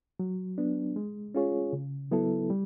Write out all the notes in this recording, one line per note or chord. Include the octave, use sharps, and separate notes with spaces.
F#3
B3 D4
G#3
C#4 F4 G#4 C#5
C#3
F#3 B3 E4 A4
G3